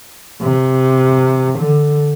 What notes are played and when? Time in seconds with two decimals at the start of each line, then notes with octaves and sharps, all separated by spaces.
0.42 C3
1.59 D3